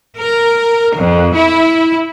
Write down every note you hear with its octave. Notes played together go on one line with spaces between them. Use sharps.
A#4
F2
E4